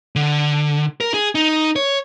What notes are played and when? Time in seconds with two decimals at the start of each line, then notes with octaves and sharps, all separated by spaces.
0.16 D3
1.01 A#4
1.14 G#4
1.35 D#4
1.76 C#5